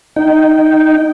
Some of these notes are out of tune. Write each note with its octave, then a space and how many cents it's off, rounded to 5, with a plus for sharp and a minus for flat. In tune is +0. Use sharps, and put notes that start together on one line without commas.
D#4 +0 G5 -20